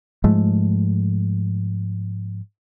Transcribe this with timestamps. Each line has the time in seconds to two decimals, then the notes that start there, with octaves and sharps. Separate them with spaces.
0.24 G#2 F3 G#3 A3